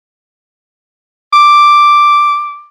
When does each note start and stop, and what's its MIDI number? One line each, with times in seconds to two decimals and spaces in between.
1.33 2.68 86